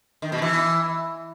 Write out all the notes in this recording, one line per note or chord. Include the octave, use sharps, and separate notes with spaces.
D#3
B2
E3